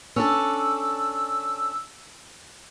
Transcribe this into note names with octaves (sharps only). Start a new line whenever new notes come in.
C#4 D4 A4 E6